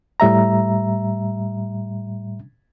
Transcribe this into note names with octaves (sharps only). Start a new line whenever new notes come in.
A2 G3 E5 A#5